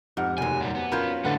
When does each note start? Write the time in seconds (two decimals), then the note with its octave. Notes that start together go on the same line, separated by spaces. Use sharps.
0.17 F2 G#2 G4 F#5 F6
0.38 F1 D#2 C3 F#3 G#5
0.61 A#2 G3
0.75 B3
0.92 F#3 C#4 F4 A#4 B5 G6
1.25 A2 D3 B3 A4 B4 F#5 A6